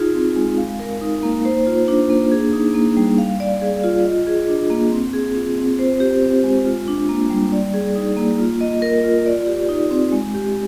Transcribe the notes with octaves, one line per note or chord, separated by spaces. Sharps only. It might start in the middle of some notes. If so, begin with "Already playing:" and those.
Already playing: D#4 F4 G#4
C4
G#3
F5
A#4
D#4
A#3
C5
F4
D4
A#3
G#4
D#4
A#3
G3
F5
D5
G#4
F4
D#5
G#4
D4
A#3
C4
G#4
F4
C4
C5
G4
C4
G#3
F4
D4
A#3
G3
D5
G#4
D#4
A#3
F4
D#5
A#4
F4
D5
G4
D#4
C4
G#3
G4